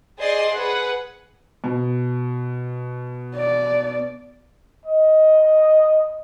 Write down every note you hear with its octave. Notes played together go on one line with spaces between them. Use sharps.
G#4 C5 D5 D#5 C6
G#4 B4 F#5
B2
D5
D#5